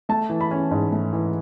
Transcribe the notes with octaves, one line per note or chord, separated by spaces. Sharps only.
A3 A5
E3
B5
C#4
G#2
A3
E3